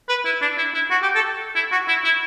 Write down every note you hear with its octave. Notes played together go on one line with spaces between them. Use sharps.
B4
E4
D4
E4
E4
F#4
G4
A4
E4
F#4
E4
E4